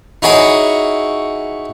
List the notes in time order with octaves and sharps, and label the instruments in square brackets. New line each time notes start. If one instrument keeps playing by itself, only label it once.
[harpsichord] D#4 E4 F#4 G#4 C#5